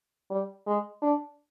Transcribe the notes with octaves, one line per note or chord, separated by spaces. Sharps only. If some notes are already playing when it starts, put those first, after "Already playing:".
G3
G#3
D4